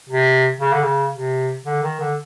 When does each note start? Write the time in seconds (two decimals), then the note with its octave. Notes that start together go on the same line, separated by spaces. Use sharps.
0.09 C3
0.61 C#3
0.73 D3
0.83 C#3
1.14 C3
1.66 D3
1.83 D#3
2.01 D3